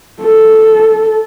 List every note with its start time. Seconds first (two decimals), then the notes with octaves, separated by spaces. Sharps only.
0.23 A4